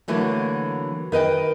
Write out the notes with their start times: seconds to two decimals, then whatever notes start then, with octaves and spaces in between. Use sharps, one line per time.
0.08 D3 E3 F#3 A3 A#3
1.12 D#3 B4 D#5 G5